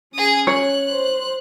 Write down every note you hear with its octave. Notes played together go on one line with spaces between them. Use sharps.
C#4 G#4 D#6
C#5 F#6
C5